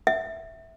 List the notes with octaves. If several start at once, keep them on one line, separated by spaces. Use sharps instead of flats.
E5